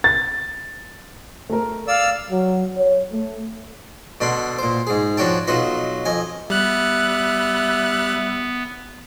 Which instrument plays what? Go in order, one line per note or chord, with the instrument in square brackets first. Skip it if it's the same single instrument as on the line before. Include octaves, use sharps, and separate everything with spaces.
[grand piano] A6
[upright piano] A3 A#4
[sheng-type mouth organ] D5 E6 [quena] F5
[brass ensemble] F#3
C#5
A3
[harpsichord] B2 D3 D4 B5 C6
A#2 C5
G#2 G#4
F3 D4 F#4 C#5 G5 A5
B1 F#3 F4 F#4 B4 D#5
F2 D#5 G#5
[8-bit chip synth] G3 F#6 [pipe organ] B3 [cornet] E5